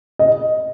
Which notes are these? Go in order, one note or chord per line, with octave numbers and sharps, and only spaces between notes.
D#5